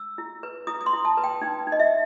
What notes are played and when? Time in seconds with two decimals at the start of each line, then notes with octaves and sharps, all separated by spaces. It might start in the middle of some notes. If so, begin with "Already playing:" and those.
Already playing: E6
0.18 E4
0.43 B4
0.67 E4 D#6
0.81 D#6
0.86 C6
0.93 E4
1.05 A5
1.17 B4
1.24 G5
1.42 D#4 G5
1.67 D#4
1.72 D#5
1.79 E5